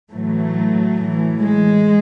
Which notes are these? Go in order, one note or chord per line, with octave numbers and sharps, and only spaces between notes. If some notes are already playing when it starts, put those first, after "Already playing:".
A2 E3 F#3 A3
A2 E3
G#3